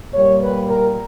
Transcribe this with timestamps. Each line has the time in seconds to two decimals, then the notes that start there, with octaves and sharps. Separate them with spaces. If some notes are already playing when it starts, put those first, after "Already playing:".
0.13 A#2 G3 C#5
0.42 B4
0.69 A#4